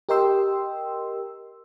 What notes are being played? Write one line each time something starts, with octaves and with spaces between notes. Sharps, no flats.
G4 A#4 D#5 G5 C6 E6